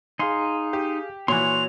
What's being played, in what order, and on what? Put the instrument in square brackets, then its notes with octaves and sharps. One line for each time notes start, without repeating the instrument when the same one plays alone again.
[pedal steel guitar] D#4 C6 [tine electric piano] G#4 F5 G#5
[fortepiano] G4
[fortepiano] A#2 E3 [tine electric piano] F#4 C#5 [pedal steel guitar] C6 C#6 F#6 [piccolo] F7